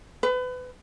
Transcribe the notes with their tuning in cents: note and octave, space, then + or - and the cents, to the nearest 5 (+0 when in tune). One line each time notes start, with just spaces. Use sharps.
B4 +30